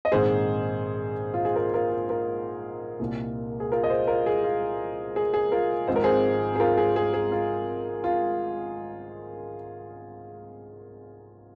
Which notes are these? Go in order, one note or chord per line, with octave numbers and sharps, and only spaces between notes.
D#5
A#1 G#2 D#3 C4 G#4 C5
F4
G#4
F4 A#4
F4 A#4
F4
F4 A#4
C2 A#2 A#3
G#4
F4 A#4
D#5
G#4 C5
F4 A#4
G#4
F4
G#4
G#4
F4 A#4
G#1 G#2 F3 C4 C5
A#4
G#4 C5
G#4
F4 A#4
G#4
G#4
G#4
F4
F4